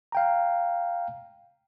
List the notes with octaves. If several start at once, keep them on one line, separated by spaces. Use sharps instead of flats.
F5 G5 A#5